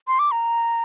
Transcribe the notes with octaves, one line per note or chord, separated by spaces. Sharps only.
C6
D6
A#5